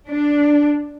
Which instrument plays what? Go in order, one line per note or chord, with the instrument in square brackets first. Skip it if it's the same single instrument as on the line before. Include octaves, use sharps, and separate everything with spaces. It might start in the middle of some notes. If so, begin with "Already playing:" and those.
[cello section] D4